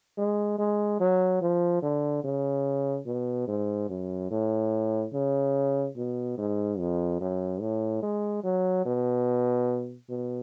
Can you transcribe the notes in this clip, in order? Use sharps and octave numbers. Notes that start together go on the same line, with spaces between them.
G#3
G#3
F#3
F3
D3
C#3
B2
G#2
F#2
A2
C#3
B2
G#2
F2
F#2
A2
G#3
F#3
B2
B2